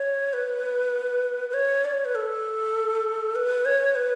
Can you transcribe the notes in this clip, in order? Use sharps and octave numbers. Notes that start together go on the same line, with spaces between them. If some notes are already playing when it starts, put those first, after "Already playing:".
Already playing: C#5
B4
B4
C#5
D5
C#5
B4
A4
B4
C#5
B4